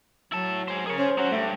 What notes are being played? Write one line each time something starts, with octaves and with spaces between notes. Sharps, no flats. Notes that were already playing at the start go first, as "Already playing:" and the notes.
F#3 E4 A5
G#4 C5
G#4 A#4 C#5
C#4 C5
F#3 C#4 F#4
G2 A3